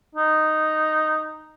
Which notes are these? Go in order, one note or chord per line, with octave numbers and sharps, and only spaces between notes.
D#4